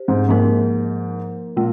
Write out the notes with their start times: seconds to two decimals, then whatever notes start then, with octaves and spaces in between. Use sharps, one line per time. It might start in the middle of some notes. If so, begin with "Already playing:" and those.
Already playing: G4 C5
0.08 G#2
0.29 G#2 F3 A#3 D#4 A#4
1.57 A#2 G#3